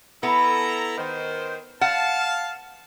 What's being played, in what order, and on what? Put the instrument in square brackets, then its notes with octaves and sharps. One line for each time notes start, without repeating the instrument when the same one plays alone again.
[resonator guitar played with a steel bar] B3 [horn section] E4 A4 A#5
[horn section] D#3 C5
[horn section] F5 A5 [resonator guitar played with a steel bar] F#5